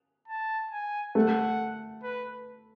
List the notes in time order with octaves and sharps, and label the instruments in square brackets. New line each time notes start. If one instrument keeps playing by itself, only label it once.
[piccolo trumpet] A5
G#5
[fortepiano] A3 [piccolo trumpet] F#5
[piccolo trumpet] B4